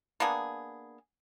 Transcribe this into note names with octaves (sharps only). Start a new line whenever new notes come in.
A#3 B3 D4 G#4